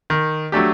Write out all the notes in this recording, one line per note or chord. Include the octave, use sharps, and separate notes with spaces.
D#3
F#3 A3 D4 G4